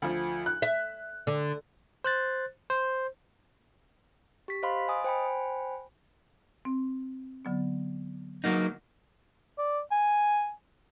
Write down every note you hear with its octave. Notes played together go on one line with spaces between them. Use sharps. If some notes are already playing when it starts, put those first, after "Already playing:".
D2 F3
F#6
E5
D3
C5 F#6 A6
C5
G4 B6
C5 D#5 F5 B5 C6
D#5 G#5 D#6
C5 G5 G#5 B5
C4
D3 F#3 B3
F#3 A#3 D#4 F#5
D5
G#5